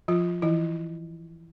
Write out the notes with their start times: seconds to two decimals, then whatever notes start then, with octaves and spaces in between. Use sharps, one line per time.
0.08 F3 F4
0.42 E3 E4